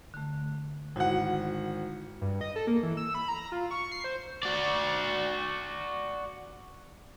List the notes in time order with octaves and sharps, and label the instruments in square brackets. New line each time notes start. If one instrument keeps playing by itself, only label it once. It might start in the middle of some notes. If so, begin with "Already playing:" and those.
[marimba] D3 A3
[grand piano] G#1 F#5 [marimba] E4 F#4
[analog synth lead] G2
D#5
A4
A#3
E3
E6
B5
A#5
F4
C#6
C7
C5
[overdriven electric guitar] F#4 D5